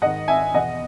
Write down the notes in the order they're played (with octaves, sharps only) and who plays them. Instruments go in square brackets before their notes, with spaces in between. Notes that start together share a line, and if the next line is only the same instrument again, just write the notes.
[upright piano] G#2 D#3 D#5 F#5
E5 G#5
E2 B2 D#5 F#5